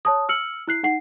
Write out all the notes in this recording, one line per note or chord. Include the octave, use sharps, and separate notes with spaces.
C#5 A5 D#6
E6 F6 C#7 F#7
E4 F#6 C7
D#4 F#5 C7